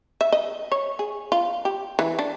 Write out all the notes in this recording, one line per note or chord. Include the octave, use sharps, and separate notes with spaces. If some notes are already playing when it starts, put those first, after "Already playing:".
E5
D#5
C#5
G#4
F4
G4
E3
D4